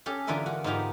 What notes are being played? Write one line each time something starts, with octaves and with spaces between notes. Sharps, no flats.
C#4 G4 A4
D3 E3 F4 A#4 D#5 E5
F#4
G#2 B3 D#4 F4 G4 A#4